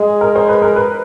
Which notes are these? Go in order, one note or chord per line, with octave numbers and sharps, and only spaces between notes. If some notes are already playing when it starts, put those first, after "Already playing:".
Already playing: G#3 G#4
A#4
C5
B4
A#4
B4